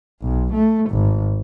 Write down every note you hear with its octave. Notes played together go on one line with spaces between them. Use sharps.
B1
A3
G#1